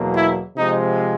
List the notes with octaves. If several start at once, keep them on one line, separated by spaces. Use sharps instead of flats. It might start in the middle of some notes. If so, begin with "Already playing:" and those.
Already playing: E2 B2 F#3 A#3
E4
C3 F3 G#3 D#4